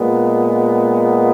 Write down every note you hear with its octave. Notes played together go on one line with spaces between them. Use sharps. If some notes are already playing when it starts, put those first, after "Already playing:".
Already playing: A#2 G#3 B3